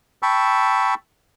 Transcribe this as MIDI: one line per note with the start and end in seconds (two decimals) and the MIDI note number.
0.23 0.94 79
0.23 0.94 81
0.23 0.94 83
0.23 0.94 85
0.23 0.94 88